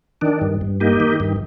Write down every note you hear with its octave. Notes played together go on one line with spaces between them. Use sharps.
D#3 D4
G2
G2
A#3 D#4 G4
D#3
G2